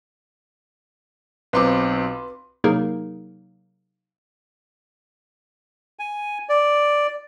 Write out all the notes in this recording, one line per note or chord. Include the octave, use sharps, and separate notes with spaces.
B1 C4 F4 B4 C6 D6
C3 F#3 A#3 D#4 G#4 A#4
G#5
D5